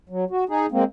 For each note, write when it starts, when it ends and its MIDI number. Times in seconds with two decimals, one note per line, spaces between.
0.09 0.25 54
0.30 0.44 66
0.49 0.66 63
0.49 0.66 68
0.72 0.84 56
0.72 0.84 58
0.72 0.84 60